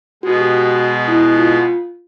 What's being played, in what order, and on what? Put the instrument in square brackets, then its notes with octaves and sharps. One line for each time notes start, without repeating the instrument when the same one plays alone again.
[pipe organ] B2 G#3 B3 [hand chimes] F#4
[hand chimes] G4
F#4
E4
F4